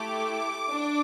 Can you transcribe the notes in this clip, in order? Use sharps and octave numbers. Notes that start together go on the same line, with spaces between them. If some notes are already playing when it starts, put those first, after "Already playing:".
Already playing: A3 E4 G4 D6
D4